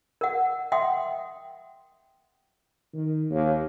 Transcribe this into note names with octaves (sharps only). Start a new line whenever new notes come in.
A#4 F#5
E5 F#5 G5 C6 D#6
D#3
D#2